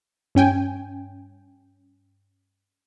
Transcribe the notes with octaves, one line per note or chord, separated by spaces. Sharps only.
G2 C#4 G5 G#5